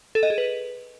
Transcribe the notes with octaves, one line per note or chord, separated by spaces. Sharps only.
A4
D#5
G#4
B4